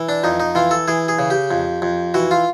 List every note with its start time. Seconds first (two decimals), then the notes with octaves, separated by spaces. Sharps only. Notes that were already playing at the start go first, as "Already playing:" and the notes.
Already playing: E3
0.09 D4
0.24 F2 D#4
0.40 D#4
0.55 E3 F4
0.71 A4
0.88 E3 G#4
1.08 G#4
1.19 C#3
1.30 G4
1.51 F2
1.82 F2
2.14 E3 F#4
2.31 F4